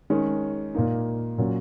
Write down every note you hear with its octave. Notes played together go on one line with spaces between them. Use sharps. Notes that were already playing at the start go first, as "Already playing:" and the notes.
D#3 G#3 C#4
A#2 A#3 D#4
A#2 F#3 C#4